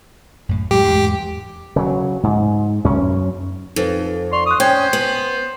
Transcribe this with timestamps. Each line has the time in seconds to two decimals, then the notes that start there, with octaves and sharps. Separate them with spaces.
0.49 F#2 A2
0.71 A2 F#3 G#3 G4
0.83 E2 G#2
1.76 C#3 F#3
2.23 G#2
2.85 F#2 C#4
3.76 F2 D#4 A4 B4
4.32 D5 C6 C#6 F7
4.46 C#6 D#6 F#6
4.60 C#4 C5 G5 G#6
4.93 B3 F#7